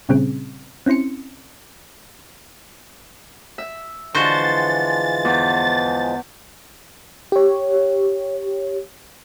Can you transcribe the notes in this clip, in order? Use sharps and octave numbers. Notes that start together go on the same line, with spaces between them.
A#2 C#3 G3 C4 C#4 G#4
C4 C#4 E4 C6 C#7
E5
D3 E3 F3 G#3 F#4 C5 C6 A6
E2
G4 C#5